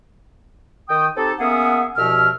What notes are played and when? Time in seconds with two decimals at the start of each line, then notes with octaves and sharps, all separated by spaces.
0.89 D#3 G5 D#6
1.16 C4 D#4 G4 A4
1.39 A#3 B3 C#4 G#4 E5 F#5
1.97 C2 B2 F3 E5 F6